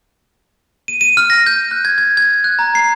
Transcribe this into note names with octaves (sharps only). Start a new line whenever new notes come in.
D#7
D#7
F6
A#6
G6
F#6
G#6
G#6
G#6
F#6
A#5
C7